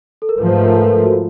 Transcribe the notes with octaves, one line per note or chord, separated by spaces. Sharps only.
A4
A#4
G#2 F3 A3 B4
C5
B4
A#4
A4
A#4
A4
F#4
F4